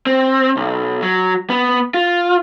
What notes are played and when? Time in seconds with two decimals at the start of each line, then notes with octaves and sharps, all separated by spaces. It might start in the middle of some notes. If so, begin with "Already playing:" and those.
0.07 C4
0.57 B1
1.02 F#3
1.50 B3
1.94 F4